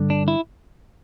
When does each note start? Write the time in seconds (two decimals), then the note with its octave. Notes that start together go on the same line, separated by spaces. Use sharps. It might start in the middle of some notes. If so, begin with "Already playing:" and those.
Already playing: G2 D3
0.10 D4
0.28 E4